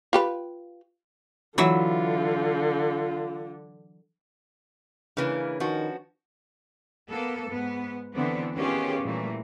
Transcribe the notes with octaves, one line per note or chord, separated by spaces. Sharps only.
F4 G4 B4
D3 E3 F#3 F4 E5
C#3 E3 A#3 C#4 D4 B4
D#3 F3 F#4
A#3 B3 A4
G#2 B3
D3 E3 B3 C4 D4
D#3 B3 C#4 F4 G4 G#4
A#2 E3 G3 A3 A#3